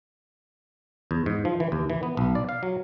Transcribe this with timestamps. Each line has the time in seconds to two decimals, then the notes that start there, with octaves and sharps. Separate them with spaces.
1.11 E2
1.26 G#2
1.45 F3
1.60 E3
1.72 D#2
1.90 E3
2.03 B3
2.17 B1
2.35 D5
2.49 F5
2.63 F#3